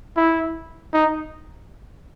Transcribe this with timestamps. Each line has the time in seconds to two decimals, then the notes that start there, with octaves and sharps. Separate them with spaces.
0.17 E4
0.93 D#4